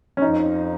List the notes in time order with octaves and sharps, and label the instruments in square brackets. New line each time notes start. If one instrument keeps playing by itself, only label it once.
[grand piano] C#4
[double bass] F2 [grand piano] D#4